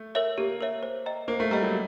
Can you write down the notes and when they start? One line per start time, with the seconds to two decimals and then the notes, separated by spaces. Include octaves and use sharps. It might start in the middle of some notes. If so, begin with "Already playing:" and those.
Already playing: A3
0.15 A#4 C#5 E5
0.38 A#3 G4
0.61 A#4 C#5 E5
0.83 C5
1.06 D#5 G5 A#5
1.28 A#3 C5
1.40 A3
1.51 G3 D#5 G5 A#5
1.63 F#3